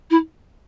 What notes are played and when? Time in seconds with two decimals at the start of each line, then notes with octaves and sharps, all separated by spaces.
0.11 E4